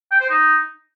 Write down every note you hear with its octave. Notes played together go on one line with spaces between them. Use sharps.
G5
C5
D#4